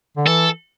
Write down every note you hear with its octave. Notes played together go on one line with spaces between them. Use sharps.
D3
E3 A4